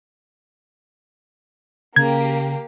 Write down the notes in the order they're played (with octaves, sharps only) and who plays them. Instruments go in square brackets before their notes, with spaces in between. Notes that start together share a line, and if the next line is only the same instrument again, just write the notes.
[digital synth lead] C#3 [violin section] A#3 G4 [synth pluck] G#6